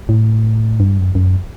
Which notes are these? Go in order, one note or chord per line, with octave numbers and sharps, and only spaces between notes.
A2
G2
F#2
F#2